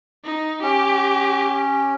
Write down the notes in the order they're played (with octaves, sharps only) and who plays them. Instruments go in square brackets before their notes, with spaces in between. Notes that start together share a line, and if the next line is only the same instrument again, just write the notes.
[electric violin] D#4
[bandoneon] C#4 [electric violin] G4